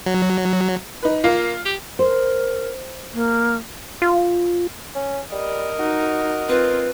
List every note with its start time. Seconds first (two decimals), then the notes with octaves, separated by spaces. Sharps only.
0.06 F#3
1.03 D#4 B4
1.24 A#3 F4
1.65 G4
1.99 A#4 C5
3.14 A#3
4.02 F4
4.95 C#4
5.32 G3 A#4 D#5
5.79 D#4 F#4
6.49 C4 F4 B4